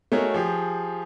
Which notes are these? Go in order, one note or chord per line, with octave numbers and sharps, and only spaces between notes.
A3 D#4 F#4 G#4 A#4 C#5
F3 G4 G#4